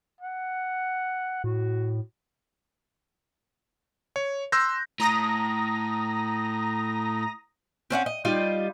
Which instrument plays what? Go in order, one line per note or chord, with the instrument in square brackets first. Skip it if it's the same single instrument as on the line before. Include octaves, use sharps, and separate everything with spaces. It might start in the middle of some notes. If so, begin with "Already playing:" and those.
[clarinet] F#5
[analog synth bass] A2 [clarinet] F#4
[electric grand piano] C#5
C6 E6 F#6 G6 A#6
[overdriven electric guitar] A2 [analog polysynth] A#5 D#6 A#6
[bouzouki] C4 C#4 F5 F#5
D#5
G3 D#4 F4